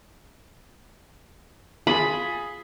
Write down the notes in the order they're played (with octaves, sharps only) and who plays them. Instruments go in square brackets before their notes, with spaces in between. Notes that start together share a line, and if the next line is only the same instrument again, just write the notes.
[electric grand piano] F4 G#4 [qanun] B5